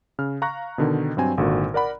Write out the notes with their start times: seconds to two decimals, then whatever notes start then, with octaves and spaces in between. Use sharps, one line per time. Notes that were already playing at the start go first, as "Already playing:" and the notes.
0.19 C#3 F6
0.42 F5 A#5 C#6 F#6 A#6
0.78 B2 D3 D#3
1.17 G2 F#3 C4 G#5
1.38 G#1 A#2 D3 F#4
1.74 A#4 D5 F#5 B5